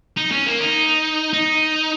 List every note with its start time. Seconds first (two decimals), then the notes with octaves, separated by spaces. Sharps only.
0.17 D#4
0.31 C#4
0.46 A#3
0.61 D#4
1.33 D#4